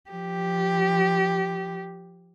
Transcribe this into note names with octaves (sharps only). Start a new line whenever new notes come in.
F3 G4